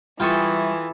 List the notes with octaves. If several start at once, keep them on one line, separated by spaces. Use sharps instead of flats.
E3 G3 E4 F4 G#4 A4 G5 C#6